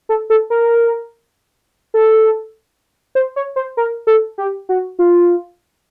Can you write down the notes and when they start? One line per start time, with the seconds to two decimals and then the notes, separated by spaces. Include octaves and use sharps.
0.09 A4
0.30 A4
0.50 A#4
1.94 A4
3.15 C5
3.36 C#5
3.56 C5
3.77 A#4
4.07 A4
4.38 G4
4.69 F#4
4.99 F4